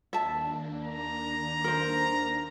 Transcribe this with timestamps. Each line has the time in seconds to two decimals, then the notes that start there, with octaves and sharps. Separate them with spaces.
0.13 D#2 A#3 D4 E5 A5
0.84 A#5
1.64 A#4 C5